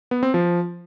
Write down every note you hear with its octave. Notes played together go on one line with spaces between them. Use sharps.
B3
C4
F3